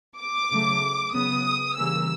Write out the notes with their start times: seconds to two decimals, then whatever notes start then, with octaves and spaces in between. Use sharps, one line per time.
0.19 D6
0.51 C#3 F#3 A3
1.13 C#3 F#3 B3 D#6
1.76 C#3 E3 G3 A#3 C#4 E6